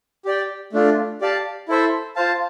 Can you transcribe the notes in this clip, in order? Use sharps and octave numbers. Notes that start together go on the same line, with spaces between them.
G4 D5 G5
A3 D4 F4
G4 D5 F5 A5
E4 A4 C5 E5
F4 C5 F5 A5